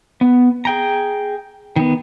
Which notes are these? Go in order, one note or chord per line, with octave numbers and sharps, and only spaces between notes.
B3
G#4 G5 A#5
D#3 B3